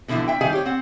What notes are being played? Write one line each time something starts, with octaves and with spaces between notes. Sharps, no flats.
B2 D3 E3 F3 E4
E5 G5
D#3 G3 G#4 F5 G#5
G4 C#5
C4 F#5